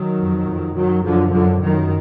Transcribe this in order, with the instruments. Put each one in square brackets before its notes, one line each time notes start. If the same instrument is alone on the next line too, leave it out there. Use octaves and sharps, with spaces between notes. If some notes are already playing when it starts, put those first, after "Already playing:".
Already playing: [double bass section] D#3 F#3
F2
F2
F#2 D#3 F#3
F#2 D3 F3
F#2 D3
F#2 D#3